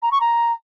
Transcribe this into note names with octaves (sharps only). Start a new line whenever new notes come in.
A#5
C#6
A#5